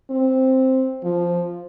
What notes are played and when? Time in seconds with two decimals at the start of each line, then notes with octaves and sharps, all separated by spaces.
0.10 C4
1.04 F3